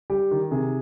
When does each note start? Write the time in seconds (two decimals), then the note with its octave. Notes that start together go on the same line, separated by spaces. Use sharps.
0.10 G3 G4
0.31 D#3
0.51 C3 G#4